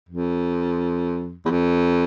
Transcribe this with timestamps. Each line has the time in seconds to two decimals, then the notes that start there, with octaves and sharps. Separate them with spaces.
0.09 F2
1.45 E2
1.50 F2